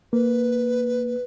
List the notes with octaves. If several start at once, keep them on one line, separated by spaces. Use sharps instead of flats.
A#3 B4